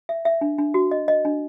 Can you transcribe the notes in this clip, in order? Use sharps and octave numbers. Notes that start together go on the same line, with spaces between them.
E5
E5
D4
D4
F#4
D#5
D#5
D4